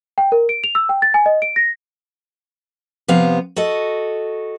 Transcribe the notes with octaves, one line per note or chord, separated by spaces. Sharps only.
G5
A#4
D7
F7
E6
G5
A6
G#5
D#5
D7
A#6
C3 F3 B3 F5
F#4 A4 D#5